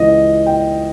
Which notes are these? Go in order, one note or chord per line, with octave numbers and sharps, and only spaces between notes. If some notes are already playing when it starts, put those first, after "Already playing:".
Already playing: C#2 C#3 E3 D#5
G5